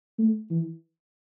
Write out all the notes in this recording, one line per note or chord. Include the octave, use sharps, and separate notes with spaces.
A3
E3